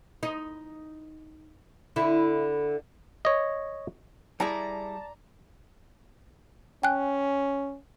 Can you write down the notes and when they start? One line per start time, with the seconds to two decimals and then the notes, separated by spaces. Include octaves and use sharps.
0.23 D#4
1.96 D3 E4
3.25 C#5 D#5
4.40 G3 E4 G#4 D5 A5 A#5
6.83 C#4 G5 G#5 F#6